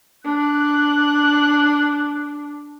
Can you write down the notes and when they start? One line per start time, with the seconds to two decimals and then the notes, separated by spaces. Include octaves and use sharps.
0.25 D4 F#6